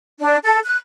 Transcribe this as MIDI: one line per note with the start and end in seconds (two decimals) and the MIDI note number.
0.20 0.36 62
0.44 0.59 69
0.65 0.76 90